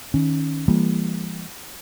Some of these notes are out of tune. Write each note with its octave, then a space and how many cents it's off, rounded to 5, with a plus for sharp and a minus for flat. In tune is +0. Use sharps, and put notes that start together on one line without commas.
D#3 +0 C#4 +0
E3 +40 G3 +40 A#3 +0